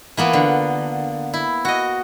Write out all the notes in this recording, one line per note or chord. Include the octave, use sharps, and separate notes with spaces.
E3 A#3 B3 F4
D3
E4
F#4 D#5